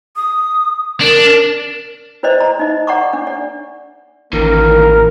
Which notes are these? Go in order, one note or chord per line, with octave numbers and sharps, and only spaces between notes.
D#6
D4 A#4
E4 B4 C5 D5 D#5
A#5
D#4 D#5
D5 F#5 A#5 C#6 D6
D4
D5
A1 D#3 E3 A#3 A#4